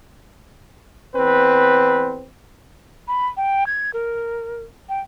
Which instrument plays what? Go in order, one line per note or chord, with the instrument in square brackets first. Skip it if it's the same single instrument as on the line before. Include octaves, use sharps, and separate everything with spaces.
[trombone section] E2 C4 B4
[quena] B5
G5
G#6
A#4
G5